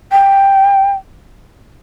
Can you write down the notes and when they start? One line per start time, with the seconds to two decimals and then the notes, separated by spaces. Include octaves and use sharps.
0.12 G5